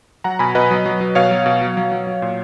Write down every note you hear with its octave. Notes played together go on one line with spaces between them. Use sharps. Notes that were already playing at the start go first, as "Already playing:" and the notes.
F#3 F#5 A#5
B2 G#5 B5
B2 B4 D#5
F#3
F#3
F#3
B2 C#5 F5
F#3
B2
F#3
F#3
F#3
F#3
A#2